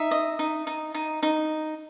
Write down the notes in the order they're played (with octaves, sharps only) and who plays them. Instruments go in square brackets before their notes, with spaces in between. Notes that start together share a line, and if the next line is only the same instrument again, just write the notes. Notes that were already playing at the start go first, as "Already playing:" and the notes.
Already playing: [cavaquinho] D#4 E5
D#5
D#4
D#4
D#4
D#4